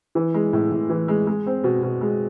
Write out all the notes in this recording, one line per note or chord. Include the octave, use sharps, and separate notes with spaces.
E3
G#3
A2
A2
E3
G#3
G#3
C4
B2
B2
G#3